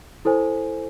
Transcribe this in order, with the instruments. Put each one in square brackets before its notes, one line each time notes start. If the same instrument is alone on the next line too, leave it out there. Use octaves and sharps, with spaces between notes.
[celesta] E4 A4 C5 G#5